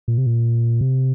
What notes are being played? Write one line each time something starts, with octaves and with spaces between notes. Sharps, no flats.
A#2
C3
A#2
C3